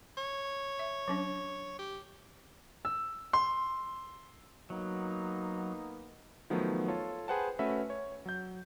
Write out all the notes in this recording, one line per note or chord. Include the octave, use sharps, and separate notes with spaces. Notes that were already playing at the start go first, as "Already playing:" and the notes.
C#5
E5
F#3 C#4 D4
G4
E6
C6
F#3 A#3 B3 D#4
D#3 F3 F#3 A3 B3
F4 A4 C#5
G#4 B4 C5 F#5 G5 A5
A3 C#4 F#4 B4 E5
C#5
F#3 G6